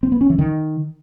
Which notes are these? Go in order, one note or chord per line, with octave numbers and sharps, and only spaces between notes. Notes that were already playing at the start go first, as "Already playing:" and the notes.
C4
B3
C#4
E3
D#3